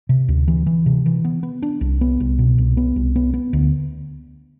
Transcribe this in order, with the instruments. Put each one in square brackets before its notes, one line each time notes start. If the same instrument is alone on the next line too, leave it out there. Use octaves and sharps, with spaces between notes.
[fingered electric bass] C3
D2
E3
E3
C3
E3
B3
B3
D4
C2
B3
C2
B2
C2
B3
C2
B3
B3
D2